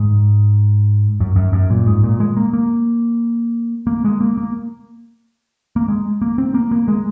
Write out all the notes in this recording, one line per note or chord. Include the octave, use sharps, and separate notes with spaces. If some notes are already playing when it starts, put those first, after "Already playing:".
Already playing: G#2
F#2
F#2
F#2
A#2
G#2
A#2
G#3
A#3
A#3
A#3
G#3
A#3
A#3
A#3
G#3
A#3
C4
A#3
A#3
G#3